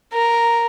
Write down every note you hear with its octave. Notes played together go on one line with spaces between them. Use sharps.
A#4